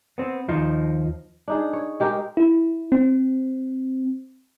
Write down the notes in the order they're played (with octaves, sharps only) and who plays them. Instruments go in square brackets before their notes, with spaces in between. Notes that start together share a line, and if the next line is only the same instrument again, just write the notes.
[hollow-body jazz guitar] B3 C4
D#2 F3 D#4
[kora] D4 D#4 G#4
C#5
G#3 G4 A#4
[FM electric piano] E4
C4